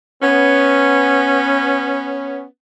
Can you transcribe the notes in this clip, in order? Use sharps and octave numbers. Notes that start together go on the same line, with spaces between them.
B3 C#4